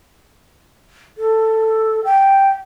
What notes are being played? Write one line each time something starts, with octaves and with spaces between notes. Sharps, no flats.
A4
G5